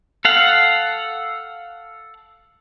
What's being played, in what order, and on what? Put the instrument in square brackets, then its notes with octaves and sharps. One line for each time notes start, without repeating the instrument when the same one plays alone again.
[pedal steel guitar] A4 F5 F#5